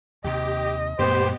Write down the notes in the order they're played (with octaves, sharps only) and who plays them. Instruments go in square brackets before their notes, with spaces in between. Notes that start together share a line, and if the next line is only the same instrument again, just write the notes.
[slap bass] D#2 C3 [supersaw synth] G4 [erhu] D#5
[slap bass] F#2 A#2 A3 [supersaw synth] B3 G4 [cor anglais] C5